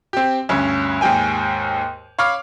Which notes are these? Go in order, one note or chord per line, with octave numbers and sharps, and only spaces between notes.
C4 G4
D2 G2 C#4
D#2 G#2 G4 G5 G#5
C#5 F5 B5 D6 F6 C7